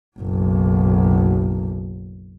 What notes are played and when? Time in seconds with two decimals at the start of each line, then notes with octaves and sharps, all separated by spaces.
0.19 F#1 B1